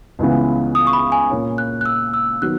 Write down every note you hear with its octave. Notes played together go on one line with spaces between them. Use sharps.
C#2 C#3 E3 B3
D#6
C#6
B5
G#5
A#2 A#3 C#4
F#6
F#6
E6
E6
D#3 F#3 B3 F#6